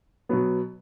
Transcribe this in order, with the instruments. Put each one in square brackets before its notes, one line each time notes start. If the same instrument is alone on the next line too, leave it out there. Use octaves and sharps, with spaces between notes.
[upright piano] B2 F#3 B3